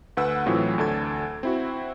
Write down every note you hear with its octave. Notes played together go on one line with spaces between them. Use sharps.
D2 B4 F#5 E6
A2 E3 F#3 C4 F4
D2 D4 A4 G#6
C4 E4 F#4